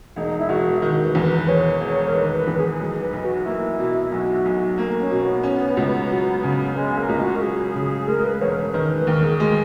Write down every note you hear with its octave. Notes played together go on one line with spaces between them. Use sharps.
E1 D#4
E4
E1 F#4
D#3 F#4
B4
E2
B4
E1 C#5
E1
A#4
D#3 B4
B4
E2
G#4
B1
B4
B1
F#4
A#3 E4
B2
B1 F#4
B1
A#3
C#4
B2
B3
C#4
C#2
F#3
C#3
G#3 C#4
A#3
C#2
F#4
A#4
F#3 G#4
C#3
G#3 A#4
B4
E1 C#5
A#4
B4
D#3 A#4
B4
D#2 A#4
G#4
G#3